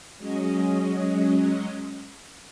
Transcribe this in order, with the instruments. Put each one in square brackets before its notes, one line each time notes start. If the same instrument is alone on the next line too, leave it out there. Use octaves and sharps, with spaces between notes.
[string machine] F#3 G#3 C#4 D#5